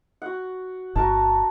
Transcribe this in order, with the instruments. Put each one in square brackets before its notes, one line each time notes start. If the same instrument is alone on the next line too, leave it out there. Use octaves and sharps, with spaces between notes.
[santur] F#4 F#5
[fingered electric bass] G1 [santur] F#4 A#4 A5